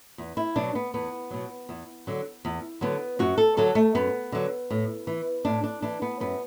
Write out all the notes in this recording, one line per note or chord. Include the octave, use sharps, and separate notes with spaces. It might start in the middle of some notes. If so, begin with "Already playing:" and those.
E2
E4
B2 F#3 D4
B3
E2 B3
B2 F#3
E2
D3 F#3
E2
D3 F#3 B3
F#2 F#4
A4
D3 F#3 A4
A3
F#2 B3
D3 F#3
A2
E3
A2 D4
D4
E3 D4
B3
F#2 B3